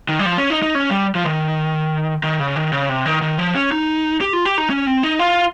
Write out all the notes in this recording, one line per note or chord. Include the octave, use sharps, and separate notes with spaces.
D#3
G3
F3
C#4
D#4
D#4
C#4
G3
F3
D#3
D#3
C#3
D#3
C#3
C3
D#3
D#3
F3
C#4
D#4
G4
F4
G4
D#4
C#4
C4
D#4
F4